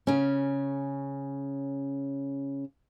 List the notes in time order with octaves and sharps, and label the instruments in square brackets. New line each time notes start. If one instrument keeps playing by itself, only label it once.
[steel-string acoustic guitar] C#3 C#4